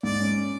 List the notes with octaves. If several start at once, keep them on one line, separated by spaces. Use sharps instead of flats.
G#2 D5
C#4